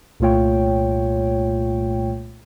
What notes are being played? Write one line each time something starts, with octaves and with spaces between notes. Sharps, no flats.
C2 A#2 A3 F4 C#5 G5